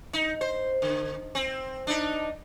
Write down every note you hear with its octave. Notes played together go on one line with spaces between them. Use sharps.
D#4
C5
D3
C4
D4 D#4